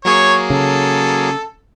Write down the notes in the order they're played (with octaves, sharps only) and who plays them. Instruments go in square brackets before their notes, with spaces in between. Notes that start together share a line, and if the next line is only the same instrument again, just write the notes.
[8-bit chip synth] F#3 A#3 G#4 [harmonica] C#5
[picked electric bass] C#3 [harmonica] A4